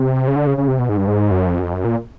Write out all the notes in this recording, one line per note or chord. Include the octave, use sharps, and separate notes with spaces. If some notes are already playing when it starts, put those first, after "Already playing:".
Already playing: C3
C#3
D3
C#3
C#3
C3
B2
G#2
G2
G#2
F#2
F2
F#2
F2
F#2
A#2